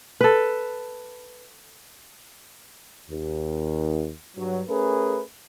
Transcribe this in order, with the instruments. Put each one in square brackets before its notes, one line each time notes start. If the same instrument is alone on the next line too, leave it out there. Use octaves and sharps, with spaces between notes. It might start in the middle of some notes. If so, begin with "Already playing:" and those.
[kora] A4 B4
[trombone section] D#2
G2 F#3
A3 C#4 G#4 A#4 B4